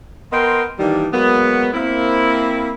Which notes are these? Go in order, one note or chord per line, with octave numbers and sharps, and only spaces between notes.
B3 A#4 D#5 G5 C6
D#3 E3 G3 A#3 D4 D#4
F#3 G#3 A#3 B3
A#3 C4 E4